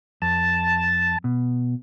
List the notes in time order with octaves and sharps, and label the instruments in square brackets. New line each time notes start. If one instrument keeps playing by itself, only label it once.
[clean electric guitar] F2 [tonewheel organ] A5
[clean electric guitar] B2